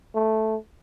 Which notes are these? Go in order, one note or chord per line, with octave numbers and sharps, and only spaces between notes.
A3